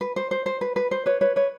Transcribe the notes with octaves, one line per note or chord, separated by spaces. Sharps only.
B4
C5
C5
C5
B4
B4
C5
B4 C#5
B4 C#5
B4 C#5